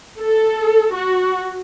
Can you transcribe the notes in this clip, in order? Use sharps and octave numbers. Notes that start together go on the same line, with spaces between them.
A4
F#4